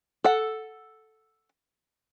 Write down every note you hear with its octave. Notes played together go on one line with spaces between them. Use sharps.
A4 F#5